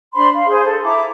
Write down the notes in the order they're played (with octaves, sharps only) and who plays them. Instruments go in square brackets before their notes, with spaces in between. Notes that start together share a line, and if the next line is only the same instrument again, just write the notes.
[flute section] D4 C5 B5 C6
F5
G#4 C5
A4
E4 A#5 D6